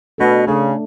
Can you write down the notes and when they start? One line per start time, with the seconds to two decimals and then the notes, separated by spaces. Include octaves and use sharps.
0.18 B2 A3 D4 A4
0.47 C#3 A3 D4 A4